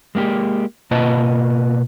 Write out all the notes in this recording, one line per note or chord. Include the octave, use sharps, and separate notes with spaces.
G#3 A#3 E4 G4
B2 A#3 F4 B4 D#5 A5